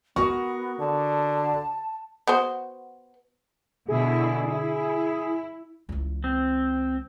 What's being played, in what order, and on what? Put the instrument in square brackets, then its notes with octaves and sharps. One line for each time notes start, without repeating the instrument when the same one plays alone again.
[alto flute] B3 [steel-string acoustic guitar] F#4 G#4 A#4 [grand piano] C#6
[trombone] D3 [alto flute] A5
[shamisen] B3 F#4 C5
[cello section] B2 D3 E4 [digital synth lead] G#4
[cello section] E4
[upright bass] C#2 E3
[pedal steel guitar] C4